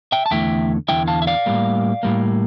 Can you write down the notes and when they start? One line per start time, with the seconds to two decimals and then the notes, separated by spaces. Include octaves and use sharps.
0.12 E5 G5
0.26 A5
0.31 E2 D3 A3 E4 E5 G5
0.88 E2 D3 A3 E4 E5 G5
1.07 F5 A5
1.22 E5
1.27 D5 F5
1.46 A2 G3 A#3
2.03 A2 G3 A#3